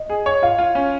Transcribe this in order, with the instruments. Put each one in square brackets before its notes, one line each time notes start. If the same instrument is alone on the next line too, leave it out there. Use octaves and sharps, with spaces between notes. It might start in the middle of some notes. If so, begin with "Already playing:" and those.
Already playing: [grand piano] D#5
[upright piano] G#4
C#5
[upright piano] F4 [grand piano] F5
[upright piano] F4
C#4